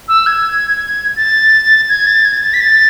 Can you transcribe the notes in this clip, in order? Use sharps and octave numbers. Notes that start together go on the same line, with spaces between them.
E6
G#6
A6
G#6
A6
G#6
A6
B6
A6